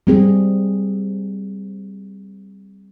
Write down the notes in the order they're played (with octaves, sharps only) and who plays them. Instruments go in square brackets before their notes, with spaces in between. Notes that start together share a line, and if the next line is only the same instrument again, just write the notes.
[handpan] G3 C4 G#4